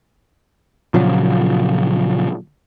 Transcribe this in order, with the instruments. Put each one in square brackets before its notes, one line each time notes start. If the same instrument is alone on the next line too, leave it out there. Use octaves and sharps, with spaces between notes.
[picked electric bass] A#2 C#3 F3 F#3